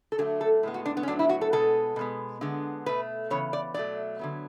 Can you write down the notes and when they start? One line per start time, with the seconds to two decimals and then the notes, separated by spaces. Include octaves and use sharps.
0.12 A4
0.18 D3 F#3 A3 G#4
0.41 A4
0.63 A2 G#3 B3
0.74 F#4
0.86 D4
0.97 B3
1.03 C#4
1.08 A2 F#3 B3 D4
1.19 E4
1.29 F#4
1.41 A4
1.53 B2 G#3 B3 A4
1.96 B2 G#3 B3
2.41 D3 G#3 B3
2.86 B2 A3 B4
3.30 C#3 E3 B3 C#5
3.53 D5
3.74 B2 F#3 A3 D5
4.19 D3 F#3 B3